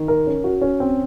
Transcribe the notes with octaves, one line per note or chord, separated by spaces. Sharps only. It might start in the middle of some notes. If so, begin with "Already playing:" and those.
Already playing: D#3
A#4
C#4
F#4
C#4
C4